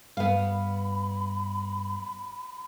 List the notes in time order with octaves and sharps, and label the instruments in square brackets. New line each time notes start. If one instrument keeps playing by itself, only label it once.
[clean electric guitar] G2 [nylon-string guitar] B3 F5 [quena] B5